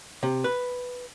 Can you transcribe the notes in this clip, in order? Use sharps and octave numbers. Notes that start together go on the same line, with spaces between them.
C3
B4